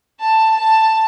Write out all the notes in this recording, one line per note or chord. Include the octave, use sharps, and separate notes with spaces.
A5
A5